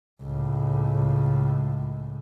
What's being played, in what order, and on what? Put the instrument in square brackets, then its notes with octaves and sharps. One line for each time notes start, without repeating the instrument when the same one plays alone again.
[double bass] C#2 A2